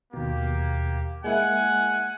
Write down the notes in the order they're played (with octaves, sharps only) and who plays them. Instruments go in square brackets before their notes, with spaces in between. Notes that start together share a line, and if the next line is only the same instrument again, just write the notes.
[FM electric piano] D#2 B2 [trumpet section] A#3 G4
[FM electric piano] G#3 A#3 E4 [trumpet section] F#5 G#5